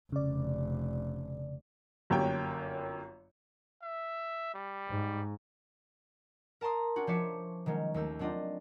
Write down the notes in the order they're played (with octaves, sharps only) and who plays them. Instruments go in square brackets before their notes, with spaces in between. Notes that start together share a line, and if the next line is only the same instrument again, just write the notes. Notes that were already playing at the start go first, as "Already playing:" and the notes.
[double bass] F1 [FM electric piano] C#3 D5
[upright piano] G1 F#2 A#3 G4 C#5 G5
[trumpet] E5
G3
[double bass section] G#2
[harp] A#4 A5 A#5 C6 D#6
C#4 D4 F#4
F3 C5 C#5 E5 D6 C#7
D#3 F#3 G#3 C#4
D#2 A3 E6 G6
F#3 C4 D4 F4 D#5